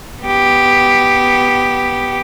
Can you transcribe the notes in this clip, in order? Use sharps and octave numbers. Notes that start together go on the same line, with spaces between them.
B3 G4